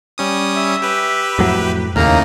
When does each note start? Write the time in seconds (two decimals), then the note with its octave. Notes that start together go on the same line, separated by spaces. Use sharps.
0.18 G3 C#4 D#6
0.56 E5
0.82 G4 B4
1.39 F2 A2 F#3
1.96 D#2 A2 C#3 A#3 D#4 A#5 F6